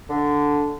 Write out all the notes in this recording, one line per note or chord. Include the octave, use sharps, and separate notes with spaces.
D3